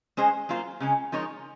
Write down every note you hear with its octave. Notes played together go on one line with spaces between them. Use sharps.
G#3 C#4 G#4 C5 D#5
F#3 A#3 F4 C5
C#3 G#3 C#4
F3 G#3 D#4 A#4 C#5